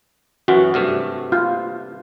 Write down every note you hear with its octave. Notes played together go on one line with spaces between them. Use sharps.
F#2 E3 F#4
G2 C3 A3
F4